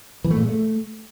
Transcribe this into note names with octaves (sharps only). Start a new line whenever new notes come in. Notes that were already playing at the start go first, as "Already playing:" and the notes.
E3
A3
A#2
G#3
A3